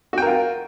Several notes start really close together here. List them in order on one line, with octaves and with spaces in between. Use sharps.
F#4 G5 A#4 F4